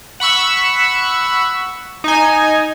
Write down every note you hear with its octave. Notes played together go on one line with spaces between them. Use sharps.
F#5 B5 C#6 E6
D#4 G#5